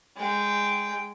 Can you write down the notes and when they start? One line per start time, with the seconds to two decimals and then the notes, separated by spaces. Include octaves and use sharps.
0.17 G#3 G5